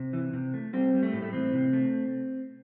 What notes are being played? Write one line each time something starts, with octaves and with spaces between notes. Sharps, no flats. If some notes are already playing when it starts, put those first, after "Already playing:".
Already playing: C3
E3
C3
A3
G3 C4
G3
A3
A2
A3
E3 C4
C3
A3